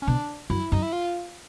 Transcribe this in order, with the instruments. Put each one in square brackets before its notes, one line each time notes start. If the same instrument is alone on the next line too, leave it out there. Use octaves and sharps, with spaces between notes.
[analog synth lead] C#4
[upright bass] B2 [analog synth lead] D4
[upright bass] F#2 [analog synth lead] E4
[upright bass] F#2 [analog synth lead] D#4
[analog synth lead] E4
F4